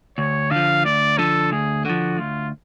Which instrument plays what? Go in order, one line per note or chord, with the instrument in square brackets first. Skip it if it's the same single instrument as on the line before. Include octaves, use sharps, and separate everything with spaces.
[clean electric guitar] D2 [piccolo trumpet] C#5
[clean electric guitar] D3 F3 [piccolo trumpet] F5
[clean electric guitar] D2 [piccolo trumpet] D5
[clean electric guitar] D3 F3 [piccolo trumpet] A4
[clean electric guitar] D2 [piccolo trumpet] G#4
[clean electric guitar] D3 F3 [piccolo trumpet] F#4
[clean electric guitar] D2 [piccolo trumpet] F4